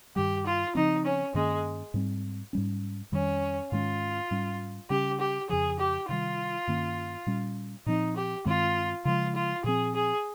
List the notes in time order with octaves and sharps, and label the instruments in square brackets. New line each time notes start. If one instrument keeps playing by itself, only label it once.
[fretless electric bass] G2 D#3 G3 [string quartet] G4
[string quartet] F4
[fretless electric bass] C#3 F3 C4 [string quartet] D#4
[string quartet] C#4
[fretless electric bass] G2 D#3 A#3 C#4 [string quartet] G#3
[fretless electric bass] G#2 G3 C4
G#2 G3 C#4
[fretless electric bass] F2 D#3 G3 [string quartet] C#4
[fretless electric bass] G#2 D#3 G#3 C#4 [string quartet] F4
[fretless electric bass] G#2 G3 C#4
[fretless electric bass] C#3 G3 C#4 [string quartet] G4
[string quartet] G4
[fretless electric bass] F2 C#3 F3 [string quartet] G#4
[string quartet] G4
[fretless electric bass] C3 D#3 G3 [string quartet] F4
[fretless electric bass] G2 D#3 A#3 C#4
A#2 G3 C#4
[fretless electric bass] A#2 F3 C4 [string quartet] D#4
[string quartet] G4
[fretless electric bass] G2 D#3 G#3 C4 [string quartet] F4
[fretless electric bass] C#3 F3 G#3 [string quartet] F4
[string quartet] F4
[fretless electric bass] A#2 F3 C4 [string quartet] G#4
[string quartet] G#4